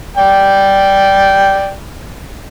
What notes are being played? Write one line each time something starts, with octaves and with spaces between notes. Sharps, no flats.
D5 G5